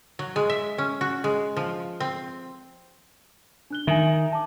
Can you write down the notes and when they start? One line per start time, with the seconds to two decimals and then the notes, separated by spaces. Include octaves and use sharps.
0.19 F#3
0.36 G#3
0.50 E5
0.78 C#4
1.01 F#4
1.24 G#3
1.57 F3
2.00 C4
3.70 D4 F#6 G7
3.87 D#3 E5 G#5
4.32 A5 D6